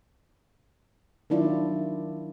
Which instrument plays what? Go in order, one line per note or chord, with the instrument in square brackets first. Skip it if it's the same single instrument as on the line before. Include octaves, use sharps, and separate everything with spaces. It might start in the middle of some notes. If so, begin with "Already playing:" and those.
[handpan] D#3 F#3 D4 E4 F4 D5